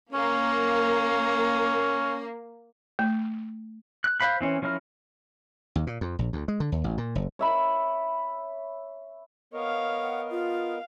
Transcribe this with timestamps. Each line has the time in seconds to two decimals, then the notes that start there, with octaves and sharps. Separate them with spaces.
0.13 A#3 C#4
2.99 A3
4.04 F#6
4.20 C5 F5 B5 F#6
4.41 E3 C4 C#4
4.62 F3 C#4 E4 A#4 F6
5.76 D#2
5.87 A#2
6.01 F2
6.19 A#1
6.33 D2
6.48 G#3
6.60 D3
6.72 D#2
6.84 A1
6.98 A#2
7.15 F#1
7.39 C#5 E5 B5
9.53 B3 A#4 C#5 D#5 F5
9.99 F#5
10.31 F4 F5